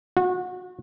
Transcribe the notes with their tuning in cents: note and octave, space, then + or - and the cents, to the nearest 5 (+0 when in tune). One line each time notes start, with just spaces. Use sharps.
F#4 -30